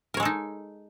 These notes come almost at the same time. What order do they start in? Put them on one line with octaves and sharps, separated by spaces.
A#4 C#5 G#3 A4 D#4